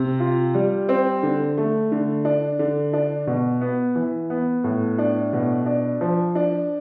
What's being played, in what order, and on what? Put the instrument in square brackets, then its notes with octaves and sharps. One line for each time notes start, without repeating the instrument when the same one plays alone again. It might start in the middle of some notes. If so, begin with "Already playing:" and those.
Already playing: [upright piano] C3
F4
G3
C4
D3
A3
D3
D4
D3
D4
B2
B3
E3
B3
A2
D4
B2
D4
F3
D4